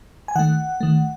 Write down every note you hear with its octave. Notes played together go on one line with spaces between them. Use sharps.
G#5
D#3 A3 F#5
D#3 A3